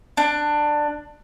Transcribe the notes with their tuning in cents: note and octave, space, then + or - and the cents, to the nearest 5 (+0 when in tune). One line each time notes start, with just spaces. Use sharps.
D4 +15